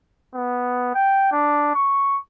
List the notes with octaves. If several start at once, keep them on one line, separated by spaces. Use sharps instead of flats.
B3
G5
D4
C#6